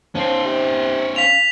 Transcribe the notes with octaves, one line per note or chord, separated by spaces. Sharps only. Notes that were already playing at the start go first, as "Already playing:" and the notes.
F3 C#4 C5
C3
F4 B6 F7